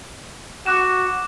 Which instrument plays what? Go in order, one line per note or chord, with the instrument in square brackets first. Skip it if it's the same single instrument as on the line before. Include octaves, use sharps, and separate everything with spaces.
[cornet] F#4 [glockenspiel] D6 F#6 E7